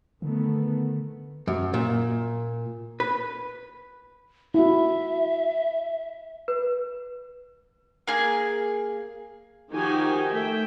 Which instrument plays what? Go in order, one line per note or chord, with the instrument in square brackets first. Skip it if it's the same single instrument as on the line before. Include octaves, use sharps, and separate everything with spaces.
[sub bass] D3 [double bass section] D#3 A3 B3
[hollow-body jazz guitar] F#2
A#2
B4
[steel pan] E4 F#4 [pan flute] E5
[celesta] B4
[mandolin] A#3 G#4
[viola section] D#3 F3 D#4 F#4 G4 G#5
A3 E5 G5